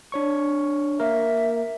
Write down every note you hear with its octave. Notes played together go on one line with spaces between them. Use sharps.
D4 C#5 C#6
A#3 A#4 E5